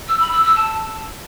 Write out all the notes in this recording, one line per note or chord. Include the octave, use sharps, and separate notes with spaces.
E6
B5
E6
E6
A5